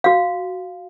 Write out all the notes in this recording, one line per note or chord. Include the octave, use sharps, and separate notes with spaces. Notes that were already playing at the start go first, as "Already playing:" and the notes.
F#4 F5